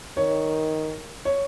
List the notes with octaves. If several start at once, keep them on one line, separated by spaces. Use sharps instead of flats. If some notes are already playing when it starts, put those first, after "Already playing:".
D#3 C#5
C#5